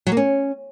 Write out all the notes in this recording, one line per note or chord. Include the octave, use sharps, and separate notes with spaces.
F#3
A#3
C#4